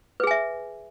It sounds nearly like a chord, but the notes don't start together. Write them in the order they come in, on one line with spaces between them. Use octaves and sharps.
B4 G#4 G#5 E5